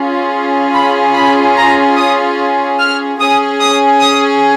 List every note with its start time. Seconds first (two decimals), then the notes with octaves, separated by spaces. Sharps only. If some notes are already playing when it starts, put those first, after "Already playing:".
Already playing: C#4 F4 G#4
0.74 B5
1.15 B5
1.56 A#5
1.96 D#6
2.79 F6
3.19 C#4 G#4 D#6
3.60 D#6
4.01 D#6